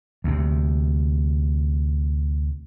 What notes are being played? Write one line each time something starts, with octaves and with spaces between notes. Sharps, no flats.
D2 C3